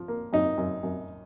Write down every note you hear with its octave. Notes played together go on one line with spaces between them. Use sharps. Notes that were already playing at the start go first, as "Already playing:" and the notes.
Already playing: F3
A#3
F#2 D#4
F#2
F#2